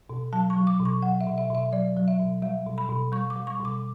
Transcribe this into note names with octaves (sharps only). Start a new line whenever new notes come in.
B2
F#3 A5
C#6
F#3
D6
B2
C#6
F#3 F#5
E5
B2
E5
B2 E5
F#3 D5
F#3
E5
B2
G3 E5
B2
B5
B2
G3 C#6
D6
G3
C#6
B2
D6